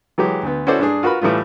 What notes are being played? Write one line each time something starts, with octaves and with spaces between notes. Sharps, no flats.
E3 F#3 G#3 G4
D2 B3
C#4 E4 F#4 A4 C5 D5
G2 D4 G#4
F4 F#4 A#4 B4 B5
A2 E3 G3 A3 F4